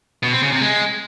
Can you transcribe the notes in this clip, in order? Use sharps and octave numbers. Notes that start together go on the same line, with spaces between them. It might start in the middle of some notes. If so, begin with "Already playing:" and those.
B2
C4
C#3
C3
G#3